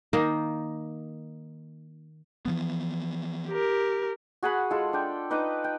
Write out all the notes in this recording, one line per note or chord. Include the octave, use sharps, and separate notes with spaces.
D#3 A#3 D#4
E3 F3 B3
G4 A#4
F#4 G#4 F#5 B5
G#3 F4 A4
D4 G5
D#4 B4 D#5 D6
G5